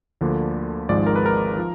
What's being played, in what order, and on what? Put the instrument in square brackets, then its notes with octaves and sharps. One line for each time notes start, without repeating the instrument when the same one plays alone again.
[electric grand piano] D2 D3 F3 A#3 D4
G#1 G#2 F3 G#3 D5
A#4
B4
A#4
F3